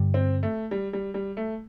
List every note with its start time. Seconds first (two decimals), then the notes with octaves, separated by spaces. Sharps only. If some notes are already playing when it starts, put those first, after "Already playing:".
Already playing: G2 D3 G3
0.14 C4
0.43 A3
0.71 G3
0.93 G3
1.14 G3
1.37 A3